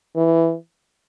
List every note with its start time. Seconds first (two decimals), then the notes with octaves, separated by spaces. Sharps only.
0.16 E3